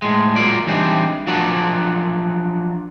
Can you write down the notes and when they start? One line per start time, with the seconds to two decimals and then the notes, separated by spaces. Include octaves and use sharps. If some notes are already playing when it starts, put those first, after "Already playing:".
0.02 A2 G#3
0.36 F#3 A#3 C4 F4 D5
0.67 E3 G3 C4 D4 D#4
1.27 F3 F#3 D4 F#4 A#4 D5